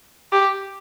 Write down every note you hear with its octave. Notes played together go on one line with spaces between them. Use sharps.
G4